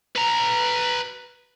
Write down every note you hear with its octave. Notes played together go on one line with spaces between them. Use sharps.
B4 A#5